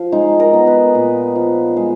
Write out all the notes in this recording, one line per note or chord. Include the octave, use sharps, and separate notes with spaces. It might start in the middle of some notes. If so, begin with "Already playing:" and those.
Already playing: F3
G#3 D#4
A#4
B3
B4
A#2
F3
G#3